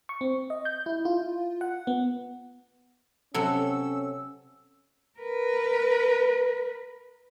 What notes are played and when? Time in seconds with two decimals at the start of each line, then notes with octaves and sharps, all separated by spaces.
0.09 C#6
0.21 C4
0.50 D#5
0.65 G6
0.86 E4
1.05 F4
1.61 F#5
1.87 B3
3.34 C3 F#3 C#4 A4 E6
5.19 A#4 B4